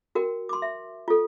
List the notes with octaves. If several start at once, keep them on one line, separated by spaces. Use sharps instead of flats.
F#4 A#4 G5
C6 D6
E5
F4 A4